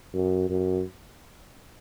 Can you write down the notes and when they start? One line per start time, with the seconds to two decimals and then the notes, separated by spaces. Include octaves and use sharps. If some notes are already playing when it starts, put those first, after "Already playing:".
0.14 F#2
0.50 F#2